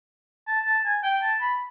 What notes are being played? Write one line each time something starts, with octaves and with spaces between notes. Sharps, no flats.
A5
A5
G#5
G5
A5
B5